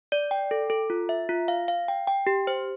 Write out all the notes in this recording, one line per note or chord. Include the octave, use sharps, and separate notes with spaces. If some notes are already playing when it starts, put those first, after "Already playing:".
D5
G5
A4
A4
F4
E5
F4
F5
F5
G5
G5
G4
C5